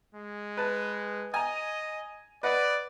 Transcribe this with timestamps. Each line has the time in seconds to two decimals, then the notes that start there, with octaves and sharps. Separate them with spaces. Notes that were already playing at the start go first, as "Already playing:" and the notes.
0.15 G#3
0.57 B4 A5
1.34 D#5 G#5 A#5
2.43 B4 D5 D#5 F#5